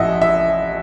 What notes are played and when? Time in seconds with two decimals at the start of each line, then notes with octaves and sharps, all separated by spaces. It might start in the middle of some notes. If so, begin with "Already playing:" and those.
Already playing: A1 F3 D#5 E5 F#5
0.22 E5